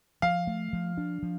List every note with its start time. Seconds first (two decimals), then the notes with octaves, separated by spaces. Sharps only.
0.22 F3 F5
0.47 A3
0.73 F3
0.98 D4
1.23 F3